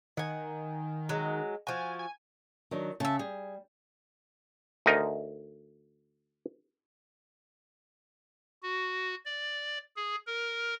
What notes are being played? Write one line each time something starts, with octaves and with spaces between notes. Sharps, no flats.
D#3 F#5 G#5
F#3 G#3
F3 F#4 G#5
G#5
D#3 F#3 D4
C#3 E5 A5
G3 G#4
D2 D#4 A#4 D#5
F#4
D5
G#4
A#4